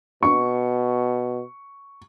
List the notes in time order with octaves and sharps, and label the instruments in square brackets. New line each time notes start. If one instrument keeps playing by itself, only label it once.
[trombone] B2 [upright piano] C#6